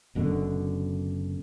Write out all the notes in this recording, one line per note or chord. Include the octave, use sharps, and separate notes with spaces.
F#1 F#2 B2 D3